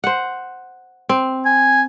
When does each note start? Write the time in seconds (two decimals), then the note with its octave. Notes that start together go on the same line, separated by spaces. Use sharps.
0.04 C5 F#5
1.09 C4
1.46 G#5